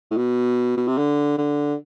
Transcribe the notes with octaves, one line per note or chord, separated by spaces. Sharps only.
A2
B2
B2
C3
D3
D3